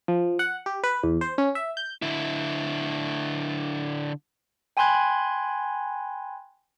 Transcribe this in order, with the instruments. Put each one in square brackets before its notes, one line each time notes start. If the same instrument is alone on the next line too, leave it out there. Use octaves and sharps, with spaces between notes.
[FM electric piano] F3
F#5
G4
B4
E2
C5
C#4
E5
G6
[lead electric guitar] D3 E4
[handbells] G5 G#5 B5 C6 F#6 G#6